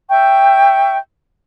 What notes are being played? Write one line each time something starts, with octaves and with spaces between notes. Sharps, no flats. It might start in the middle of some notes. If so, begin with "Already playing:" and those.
E5 G5 C#6 G6